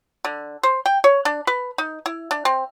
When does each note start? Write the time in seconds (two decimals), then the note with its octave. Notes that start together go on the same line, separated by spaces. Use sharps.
0.25 D3
0.63 C5
0.86 G5
1.04 C#5
1.25 D4
1.47 B4
1.78 D#4
2.06 E4
2.31 D4
2.45 C4